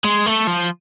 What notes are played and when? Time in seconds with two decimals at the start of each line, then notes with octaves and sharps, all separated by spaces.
0.04 G#3
0.26 A3
0.47 F3